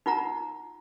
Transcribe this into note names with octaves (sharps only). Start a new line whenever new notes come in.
D#4 F4 F#5 A#5